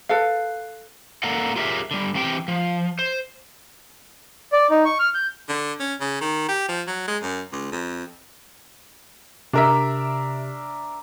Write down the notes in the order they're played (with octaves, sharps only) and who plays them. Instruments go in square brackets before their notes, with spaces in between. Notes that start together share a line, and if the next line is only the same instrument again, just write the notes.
[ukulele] A4 B4 F5
[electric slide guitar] A#3 A4 A#4 D5 F#5
F4 G4 G#4 A#4 C#5 E5
D3 G3
E3 C4 G4 G5
F3
C5
[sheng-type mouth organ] D5
D#4
C#6
F6
G6
[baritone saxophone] D3
C#4
C#3
D#3
G4
F3
F#3
G#3
F#2
C#2
F2
[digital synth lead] C3 [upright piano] D4 A#4 E5